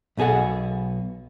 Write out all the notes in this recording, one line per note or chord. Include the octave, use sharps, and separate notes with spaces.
B1 B2 G#4 A4 F#5